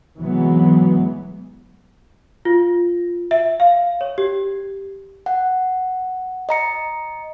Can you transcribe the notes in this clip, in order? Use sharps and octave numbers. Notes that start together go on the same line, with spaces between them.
C3 E3 F#3 G#3 B3
F4
E5
F5
C#5
G4
F#5
D#5 A#5 C#7